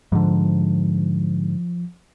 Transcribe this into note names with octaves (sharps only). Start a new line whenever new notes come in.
G#2 D3 F3